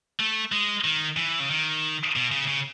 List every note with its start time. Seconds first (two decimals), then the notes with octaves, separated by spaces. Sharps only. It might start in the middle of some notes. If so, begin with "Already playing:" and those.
0.20 A3
0.52 G#3
0.84 D#3
1.17 E3
1.40 C#3
1.50 D#3
2.16 B2
2.32 C#3
2.47 C#3